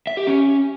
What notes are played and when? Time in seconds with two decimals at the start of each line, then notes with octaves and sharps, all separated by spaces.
0.07 E5
0.17 G4
0.27 C#4